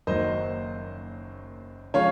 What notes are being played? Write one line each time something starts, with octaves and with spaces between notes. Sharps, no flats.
F#1 F#2 D#3 F#3 A#3 C5 D#5
C#3 F3 G#3 C#5 F5